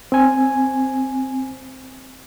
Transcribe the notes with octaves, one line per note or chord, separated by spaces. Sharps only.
C4 G#5